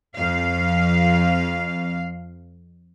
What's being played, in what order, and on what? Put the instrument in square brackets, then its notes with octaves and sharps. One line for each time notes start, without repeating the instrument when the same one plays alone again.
[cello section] F2 F5